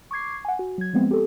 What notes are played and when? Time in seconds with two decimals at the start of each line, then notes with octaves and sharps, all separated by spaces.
0.11 C#6 D6 G#6 C7
0.45 F#5 G#5
0.59 F#4
0.78 F#3 G#6
0.94 F3 G#3 B3 C4
1.11 G4 A4